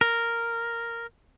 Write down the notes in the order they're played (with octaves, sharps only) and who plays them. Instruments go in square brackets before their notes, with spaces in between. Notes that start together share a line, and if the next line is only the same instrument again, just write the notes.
[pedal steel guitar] A#4